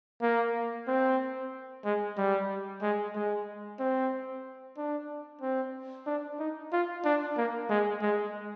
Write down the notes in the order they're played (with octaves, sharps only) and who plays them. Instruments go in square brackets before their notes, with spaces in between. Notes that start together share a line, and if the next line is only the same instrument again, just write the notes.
[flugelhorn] A#3
C4
G#3
G3
G#3
G#3
C4
D4
C4
D4
D#4
F4
D4
A#3
G#3
G#3